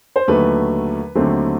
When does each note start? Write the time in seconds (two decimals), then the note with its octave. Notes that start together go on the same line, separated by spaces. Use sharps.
0.16 C5
0.27 D#2 D3 F#3 A3 B4
1.15 D#2 D3 F#3 A3 C4